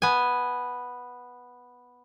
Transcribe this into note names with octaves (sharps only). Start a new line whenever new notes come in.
B3 G#5